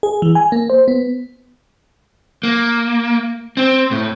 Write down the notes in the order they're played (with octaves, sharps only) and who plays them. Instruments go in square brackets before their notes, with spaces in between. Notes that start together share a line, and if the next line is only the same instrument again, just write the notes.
[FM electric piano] G#4
E3
G#5
A#3
C5
B3
[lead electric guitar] A#3
C4
A2